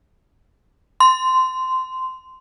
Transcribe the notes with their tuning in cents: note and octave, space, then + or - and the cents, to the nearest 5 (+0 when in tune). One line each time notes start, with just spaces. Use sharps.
C6 -15